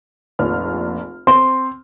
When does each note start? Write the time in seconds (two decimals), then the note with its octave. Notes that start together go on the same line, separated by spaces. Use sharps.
0.39 F1 A#1 F6
1.27 C4 C6